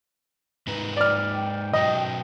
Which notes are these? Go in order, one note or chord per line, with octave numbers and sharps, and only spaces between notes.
G#2 D#4 B4
D5 F6
G5
B2 F#3 D5 D#5